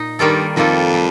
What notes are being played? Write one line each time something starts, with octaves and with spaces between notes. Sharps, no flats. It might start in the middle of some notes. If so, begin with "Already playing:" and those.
Already playing: A#2 D#4
G2 D#3 G3 A#3 F4 A4
F2 D#3 G3 A#3 F4 A4
G3